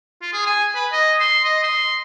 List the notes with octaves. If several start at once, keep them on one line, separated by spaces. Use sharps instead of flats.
F4
G#4
G#5
B4
D#5
C6
D#5
C6